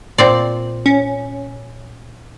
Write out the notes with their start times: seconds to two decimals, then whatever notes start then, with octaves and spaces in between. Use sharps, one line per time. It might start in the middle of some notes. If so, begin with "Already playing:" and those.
0.18 A#2 C4 D5
0.86 C#4